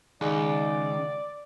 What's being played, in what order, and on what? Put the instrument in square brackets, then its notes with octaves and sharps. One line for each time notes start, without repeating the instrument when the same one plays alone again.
[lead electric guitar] C#2 [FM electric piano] D#3 D#4 G#4 [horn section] D5